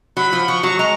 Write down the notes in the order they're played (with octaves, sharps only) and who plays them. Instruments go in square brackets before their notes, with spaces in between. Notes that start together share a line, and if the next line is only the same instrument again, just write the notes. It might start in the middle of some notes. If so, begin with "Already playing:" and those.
[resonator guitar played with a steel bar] F#3 [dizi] B5
[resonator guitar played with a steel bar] F3
[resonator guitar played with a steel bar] F3 [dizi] C#6
[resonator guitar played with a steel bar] F#3 [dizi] C#6
[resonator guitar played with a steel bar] G#3 [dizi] A#5